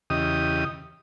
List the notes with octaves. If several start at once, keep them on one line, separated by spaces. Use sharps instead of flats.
E2 C#3 G4 D#5 D#6